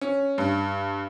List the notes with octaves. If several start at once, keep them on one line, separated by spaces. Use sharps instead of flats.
C#4
G2